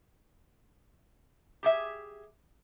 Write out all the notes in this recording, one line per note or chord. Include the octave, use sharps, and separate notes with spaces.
G4 G#4 E5